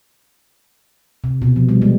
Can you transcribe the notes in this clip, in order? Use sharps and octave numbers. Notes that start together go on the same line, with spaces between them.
C3
B2
F3
G3
G#3